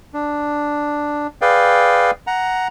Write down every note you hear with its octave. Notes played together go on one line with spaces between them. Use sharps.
D4
G#4 B4 D5 F5 G5
F#5 A#5